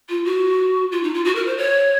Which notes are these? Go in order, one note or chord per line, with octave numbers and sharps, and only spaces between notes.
F4
F#4
F4
D#4
F4
F#4
A#4
C5
C#5